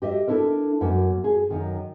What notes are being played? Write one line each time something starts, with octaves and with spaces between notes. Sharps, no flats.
G4 D#5 E5
D4 E4 A4 A#4
F#2 A#3
G#4
F#2 D#3